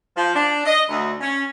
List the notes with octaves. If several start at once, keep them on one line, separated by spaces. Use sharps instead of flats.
F3
D4
D#5
D2
C#4